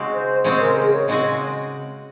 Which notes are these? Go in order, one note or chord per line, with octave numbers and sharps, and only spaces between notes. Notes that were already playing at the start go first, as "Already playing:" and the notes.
Already playing: C#3 G#3 C4 F#4
C5
C#3 G#3 C4 F#4 C5
A#4
G#4
C#5
C#3 G#3 C4 F#4 D#5